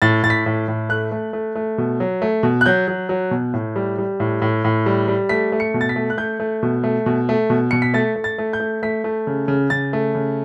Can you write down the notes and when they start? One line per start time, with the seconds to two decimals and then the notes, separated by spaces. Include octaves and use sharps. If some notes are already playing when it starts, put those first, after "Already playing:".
0.02 A2 A6
0.23 A2 A6
0.30 B6
0.46 A2
0.68 A2
0.89 A3 F#6
1.11 A3
1.33 A3
1.55 A3
1.78 B2
2.00 F#3
2.22 A3
2.43 B2
2.61 F#6
2.66 F#3 G6
2.88 F#3
3.09 F#3
3.31 B2
3.54 A2
3.76 G3
3.98 G3
4.20 A2
4.42 A2
4.64 A2
4.86 G3
5.08 G3
5.29 A3 B6
5.52 A3
5.60 C#7
5.74 B2
5.81 A6
5.89 B6
5.96 A3
6.10 F#6
6.17 A3 G6
6.40 A3
6.63 B2
6.84 A3
7.06 B2
7.29 A3
7.50 B2
7.71 B2 C#7
7.82 B6
7.94 A3 A6
8.16 A3
8.24 A6
8.38 A3
8.53 G6
8.60 A3
8.83 A3 B6
9.04 A3
9.27 C#3
9.48 C#3
9.70 C#3 A6
9.93 A3
10.15 C#3